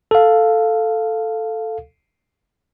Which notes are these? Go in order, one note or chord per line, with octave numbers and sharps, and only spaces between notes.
A4 F5